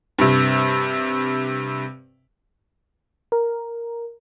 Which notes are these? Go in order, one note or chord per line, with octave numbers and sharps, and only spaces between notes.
G2 C3
A#4